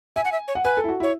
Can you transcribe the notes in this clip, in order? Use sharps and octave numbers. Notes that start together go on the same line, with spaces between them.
E5 G#5
F#5
E5
C#5
F#5
B4 G#5
A4
E4
F#4
E4 C#5